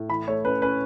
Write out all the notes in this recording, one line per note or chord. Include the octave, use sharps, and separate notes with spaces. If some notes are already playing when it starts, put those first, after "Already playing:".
Already playing: A2
E3 B5
A3 C#5
C#4 B4
C#4 B4